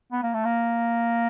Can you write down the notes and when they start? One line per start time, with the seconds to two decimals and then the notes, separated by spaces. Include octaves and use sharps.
0.12 B3
0.23 A#3
0.34 A3
0.45 A#3